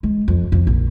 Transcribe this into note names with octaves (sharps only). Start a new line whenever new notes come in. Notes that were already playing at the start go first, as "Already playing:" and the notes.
G#3
F2
F2
A#1